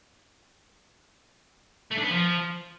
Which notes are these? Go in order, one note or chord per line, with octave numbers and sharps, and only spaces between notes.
A3
D4
B3
F3